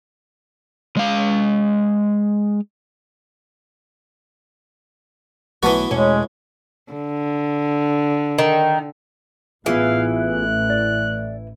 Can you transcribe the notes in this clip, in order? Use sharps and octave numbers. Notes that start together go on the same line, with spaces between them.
G#3 F5
B1 E3 F#3 A3 B3 F#4
E2 B2 G#3 A3 C#4
D3
D#3
A1 E3 B3 F4 G#4 F5
F#6
D5